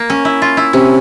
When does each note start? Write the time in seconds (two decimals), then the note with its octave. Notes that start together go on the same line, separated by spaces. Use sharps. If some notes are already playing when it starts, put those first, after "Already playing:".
Already playing: A#3
0.10 C#4
0.25 E4
0.42 F4
0.57 E4
0.73 C3 C#4